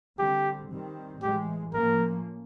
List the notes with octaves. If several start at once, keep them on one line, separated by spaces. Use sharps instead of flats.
D3 G3 C4 G4
D#3 G3 C4
A2 E3 G#3 G4
A2 F3 A#3 C#4 A#4